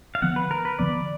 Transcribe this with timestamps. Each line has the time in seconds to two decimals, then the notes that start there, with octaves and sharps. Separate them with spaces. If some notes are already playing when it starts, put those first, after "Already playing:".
0.15 F5
0.22 D3 F3 B3 F#5
0.36 B4
0.51 A#4
0.65 B4
0.79 D3 F3 B3 D5